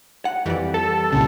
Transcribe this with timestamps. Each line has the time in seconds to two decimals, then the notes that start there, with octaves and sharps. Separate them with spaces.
0.25 F#5
0.46 F2 E3 G3 D5
0.74 A4
1.13 C2 A#2 C#3